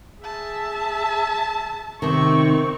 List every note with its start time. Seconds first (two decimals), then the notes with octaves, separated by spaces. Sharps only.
0.24 G#4 E5 A5
2.02 C3 D#3 C4 C#6